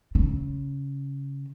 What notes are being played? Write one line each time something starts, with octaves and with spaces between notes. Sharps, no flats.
C#3